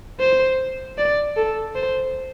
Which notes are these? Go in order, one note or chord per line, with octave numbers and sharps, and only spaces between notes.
C5
D5
A4
C5